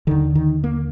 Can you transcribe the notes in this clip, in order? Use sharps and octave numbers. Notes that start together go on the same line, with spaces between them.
D#2 D3 D#3
D#3
A#3